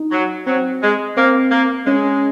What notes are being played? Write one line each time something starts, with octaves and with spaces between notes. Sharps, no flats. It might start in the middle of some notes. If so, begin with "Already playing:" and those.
Already playing: D#4
F#3
F#3 C4
G#3
A#3 C4
A#3
G#3 C#4